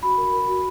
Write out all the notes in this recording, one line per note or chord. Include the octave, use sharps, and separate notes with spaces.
F#4 B5
A#4
A#4
F#4